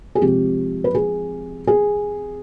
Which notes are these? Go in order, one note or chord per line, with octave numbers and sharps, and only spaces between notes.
G#4
C3 F3 G#3 C4 G4
B4
G#4
G#4